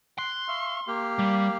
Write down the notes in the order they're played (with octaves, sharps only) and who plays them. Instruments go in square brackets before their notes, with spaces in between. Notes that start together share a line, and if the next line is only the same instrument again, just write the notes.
[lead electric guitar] C6 [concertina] F#6
[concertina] E5 F5 C#6
A#3 G4 F5
[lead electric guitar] G3